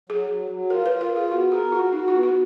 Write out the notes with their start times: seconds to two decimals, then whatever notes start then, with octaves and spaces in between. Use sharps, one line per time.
0.10 F#3 G#4
0.30 F#3
0.50 F#3
0.70 F4 A#4
0.86 B4
0.91 F4
1.01 A#4
1.12 F4 G#4
1.31 B3 F#4
1.52 G#4 A#4
1.72 F4 F#4
1.92 D#4 F#4
2.08 F4
2.14 B3
2.23 F#4